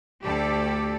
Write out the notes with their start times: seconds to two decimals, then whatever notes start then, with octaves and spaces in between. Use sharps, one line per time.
0.22 D2 G4 A4 D5